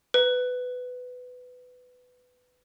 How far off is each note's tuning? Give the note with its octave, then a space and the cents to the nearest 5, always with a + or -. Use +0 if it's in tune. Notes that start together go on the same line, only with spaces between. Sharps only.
B4 +15